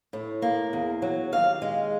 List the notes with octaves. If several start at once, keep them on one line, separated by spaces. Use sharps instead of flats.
A2
A#3
E2
F#3
D#2 F5
G#3